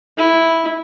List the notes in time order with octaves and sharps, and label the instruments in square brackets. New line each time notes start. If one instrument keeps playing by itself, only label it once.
[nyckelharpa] E4